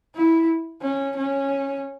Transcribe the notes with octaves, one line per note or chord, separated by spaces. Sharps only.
E4
C#4
C#4